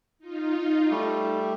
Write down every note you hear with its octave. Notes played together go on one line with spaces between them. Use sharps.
D#4 F4
G3 A3